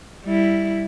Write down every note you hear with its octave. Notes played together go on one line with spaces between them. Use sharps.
G3 E4